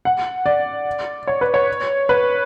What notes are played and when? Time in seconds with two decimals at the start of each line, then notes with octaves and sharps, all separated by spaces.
0.05 F#5
0.46 D5
1.27 C#5
1.41 B4
1.54 C#5
2.09 B4